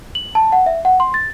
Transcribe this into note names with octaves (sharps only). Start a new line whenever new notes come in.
F#7
A5
F#5
E5
F#5
C6
A6